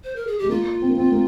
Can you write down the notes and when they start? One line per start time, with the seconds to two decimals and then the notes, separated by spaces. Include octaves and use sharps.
0.04 C5
0.16 A#4
0.27 G#4
0.39 G#3 G4
0.49 A#3 F4
0.82 C4
0.89 A#3
0.98 C4
1.12 A#3